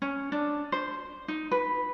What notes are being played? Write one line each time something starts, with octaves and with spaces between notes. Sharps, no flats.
C#4
D4
C5
D#4
B4